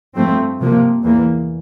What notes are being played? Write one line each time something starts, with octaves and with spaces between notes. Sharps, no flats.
G2 F3 A3 C4
C3 F3 A#3
E2 E3 A#3